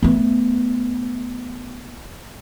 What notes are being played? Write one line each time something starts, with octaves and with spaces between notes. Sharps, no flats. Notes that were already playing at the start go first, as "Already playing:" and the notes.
A3 B3